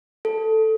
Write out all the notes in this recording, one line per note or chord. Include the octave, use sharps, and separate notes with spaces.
A4